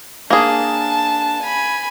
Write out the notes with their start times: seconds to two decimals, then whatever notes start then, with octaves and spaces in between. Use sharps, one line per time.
0.30 A#3 D4 G#4 A5
1.42 G#5 B5